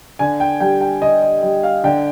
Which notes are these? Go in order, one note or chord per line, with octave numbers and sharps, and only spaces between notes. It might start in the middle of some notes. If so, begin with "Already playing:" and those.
D3 G#5
G5
G3 G5
G5
D3 D#5
D#5
G3 D#5
F5
D3 G5